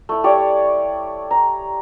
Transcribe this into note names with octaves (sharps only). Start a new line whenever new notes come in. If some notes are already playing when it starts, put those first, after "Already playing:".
A3 E4
G4 C#5 D5
A#5